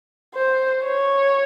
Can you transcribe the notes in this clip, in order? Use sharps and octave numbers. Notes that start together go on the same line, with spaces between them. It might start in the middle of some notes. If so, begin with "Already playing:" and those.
C5
C#5